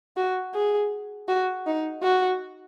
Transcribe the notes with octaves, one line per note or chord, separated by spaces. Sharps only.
F#4
G#4
F#4
D#4
F#4